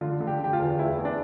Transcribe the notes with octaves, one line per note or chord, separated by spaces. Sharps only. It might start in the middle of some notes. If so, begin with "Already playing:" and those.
D3 F4
D3
G4
D3 G4
F4
E2
E2 E4
E2
D4